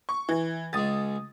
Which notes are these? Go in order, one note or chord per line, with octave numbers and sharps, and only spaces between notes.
C#6
E3
C#2 G#3 D#6 A6